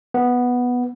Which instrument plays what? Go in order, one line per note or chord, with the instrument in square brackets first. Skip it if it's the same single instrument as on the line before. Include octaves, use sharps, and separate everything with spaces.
[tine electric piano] B3